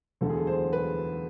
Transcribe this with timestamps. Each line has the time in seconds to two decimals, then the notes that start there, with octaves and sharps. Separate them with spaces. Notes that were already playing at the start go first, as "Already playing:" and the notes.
0.21 E1 D2 D3 A4
0.29 G#4
0.37 A4
0.47 C5
0.73 B4